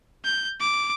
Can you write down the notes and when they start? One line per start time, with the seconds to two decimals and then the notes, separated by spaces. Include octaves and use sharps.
0.24 G6
0.60 D6